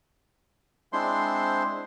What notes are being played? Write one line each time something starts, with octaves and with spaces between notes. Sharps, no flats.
G#3 C4 D4 E4 C5 C6